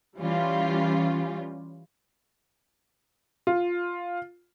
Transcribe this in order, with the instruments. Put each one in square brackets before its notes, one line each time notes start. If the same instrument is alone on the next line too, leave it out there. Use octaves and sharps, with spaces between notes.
[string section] E3 G3 C#4 F4
[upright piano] F4